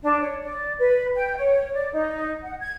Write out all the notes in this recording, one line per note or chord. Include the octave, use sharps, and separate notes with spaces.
D4
C#5
D5
B4
G5
C#5
D5
D#4
F#5
G#6